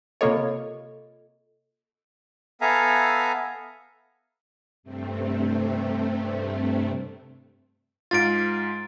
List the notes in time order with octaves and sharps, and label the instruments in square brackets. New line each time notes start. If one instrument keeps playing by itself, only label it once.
[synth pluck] C3 A#3 C#5 [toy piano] F4 A4 D#5
[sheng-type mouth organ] B3 A4 E5 F5 G#5 A#5
[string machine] G2 C3 A3 C4
[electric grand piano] G#2 F4 [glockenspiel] A6 D7